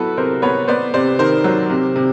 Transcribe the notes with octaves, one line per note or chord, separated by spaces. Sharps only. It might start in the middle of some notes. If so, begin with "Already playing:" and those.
Already playing: F#3 B3 E4 F#4 A4 B4
C3 A#4 C5
B3 B4 C#5
B3 C5 D5
C3 C5 D5
D#3 A#4 C5
F#3
C3
C3